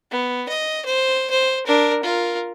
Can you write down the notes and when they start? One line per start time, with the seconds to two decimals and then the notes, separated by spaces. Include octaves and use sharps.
0.11 B3
0.49 D#5
0.85 C5
1.31 C5
1.67 D4 A#4
2.03 F4 A#4